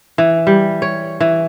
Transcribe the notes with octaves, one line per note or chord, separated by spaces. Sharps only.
E3
G3
C#5
E3